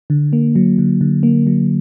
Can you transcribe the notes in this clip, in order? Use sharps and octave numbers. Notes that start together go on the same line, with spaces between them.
D3
A#3
F#3
D3
D3
A#3
F#3